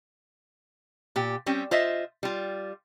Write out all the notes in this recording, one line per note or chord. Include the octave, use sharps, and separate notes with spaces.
A#2 G4
G3 C4 C#4
F4 C5 D#5 E5
G3 F4